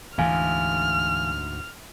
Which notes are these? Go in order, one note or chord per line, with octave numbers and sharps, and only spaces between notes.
D2 G#2 E3 F5 G#5 F6